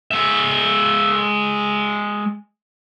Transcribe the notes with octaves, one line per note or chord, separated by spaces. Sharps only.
G#3 E5